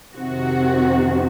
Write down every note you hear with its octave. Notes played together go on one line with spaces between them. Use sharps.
F2 C3 D#3 F#4